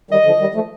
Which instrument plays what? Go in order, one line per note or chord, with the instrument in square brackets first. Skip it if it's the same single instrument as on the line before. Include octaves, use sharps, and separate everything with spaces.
[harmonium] D#3 G3 [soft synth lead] D#5
[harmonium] D3 F3
D#3 G3
F3 A3